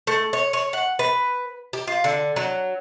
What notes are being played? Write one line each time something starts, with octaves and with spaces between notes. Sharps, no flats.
A3
C#5
C#5
F#5
B4
G4
F4
D3
F#3